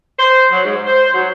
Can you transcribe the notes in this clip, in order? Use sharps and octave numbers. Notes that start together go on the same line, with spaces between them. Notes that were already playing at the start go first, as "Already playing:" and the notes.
C5
F#3
G#2
C5
F#3